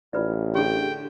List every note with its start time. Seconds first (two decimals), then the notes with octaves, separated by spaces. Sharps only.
0.13 A1 F4 B4 D5
0.55 D3 G4 G#4 G5